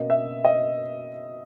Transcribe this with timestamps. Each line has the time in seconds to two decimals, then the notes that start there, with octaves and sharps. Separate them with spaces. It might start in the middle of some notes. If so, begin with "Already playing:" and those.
Already playing: B2 A#3 C#4 D#5
0.10 E5
0.45 D#5